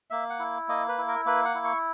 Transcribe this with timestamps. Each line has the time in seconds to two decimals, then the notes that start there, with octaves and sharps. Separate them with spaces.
0.10 A#3 E5
0.30 F#5
0.40 E4
0.68 A#3 D#5
0.88 B4
0.98 E4
1.08 A#4
1.26 A#3 B4
1.45 F#5
1.55 E4
1.65 C#6